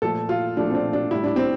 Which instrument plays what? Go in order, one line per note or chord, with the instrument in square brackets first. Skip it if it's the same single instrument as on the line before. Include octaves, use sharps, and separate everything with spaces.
[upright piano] A#2 F3 A3 A4
F4
A#2 F3 A3 D4
C4
D4
D4
A2 G3 E4
D4
C4